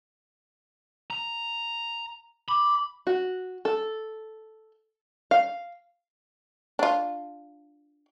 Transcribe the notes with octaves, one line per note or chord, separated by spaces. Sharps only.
A#5
B5 D6
F#4
A4
F5
D4 F4